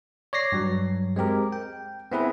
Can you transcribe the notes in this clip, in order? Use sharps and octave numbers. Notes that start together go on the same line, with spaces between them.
C#5 D5 A#6 C7
G2 F#3
G#3 C4 G4 A#4
G5
B3 C4 E4 G#4 B4